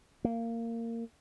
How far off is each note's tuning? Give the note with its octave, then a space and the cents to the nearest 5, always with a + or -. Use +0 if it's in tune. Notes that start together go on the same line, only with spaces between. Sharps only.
A#3 -20